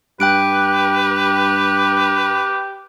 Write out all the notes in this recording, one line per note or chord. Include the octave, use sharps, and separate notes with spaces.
G2 G4 B4 G5 F#6 D7